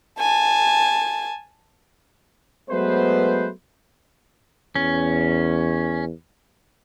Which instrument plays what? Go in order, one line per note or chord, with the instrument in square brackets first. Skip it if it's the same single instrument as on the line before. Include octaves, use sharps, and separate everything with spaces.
[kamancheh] G#5 A5
[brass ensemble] F#3 G#3 A3 B3 B4 C5
[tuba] E2 [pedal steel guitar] C#4